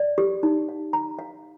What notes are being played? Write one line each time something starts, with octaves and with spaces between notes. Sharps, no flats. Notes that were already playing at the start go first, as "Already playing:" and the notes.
Already playing: D5
G4
D#4
F5
A#5
F5